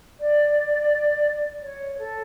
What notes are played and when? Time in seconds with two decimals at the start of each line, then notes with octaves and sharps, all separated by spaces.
0.20 D5
1.62 C#5
1.98 A4